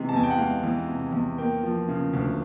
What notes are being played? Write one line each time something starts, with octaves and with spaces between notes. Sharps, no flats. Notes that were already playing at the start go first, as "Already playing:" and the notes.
Already playing: C3 E3 G#3
A5
E2 G#5
G5
F#5
G#3 F5
E3
C3
E2
A#3 G5
F3
C#3
D2